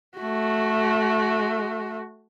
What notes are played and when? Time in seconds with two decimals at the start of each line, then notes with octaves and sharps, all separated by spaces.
0.18 A3 F#4